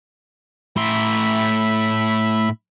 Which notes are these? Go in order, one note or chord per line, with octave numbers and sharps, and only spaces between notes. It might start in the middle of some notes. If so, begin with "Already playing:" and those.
A2 E5 B5 C6